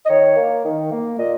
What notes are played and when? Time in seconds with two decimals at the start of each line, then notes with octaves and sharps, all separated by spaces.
0.05 D#5
0.09 D#3 C#5
0.36 A#3
0.64 D#3
0.91 A#3
1.19 A#2 D#5